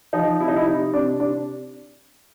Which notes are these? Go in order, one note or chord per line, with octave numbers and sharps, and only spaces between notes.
F3 D#4
C3 E4
D#4
E4
C3 D#4
C3 D4
C3 D4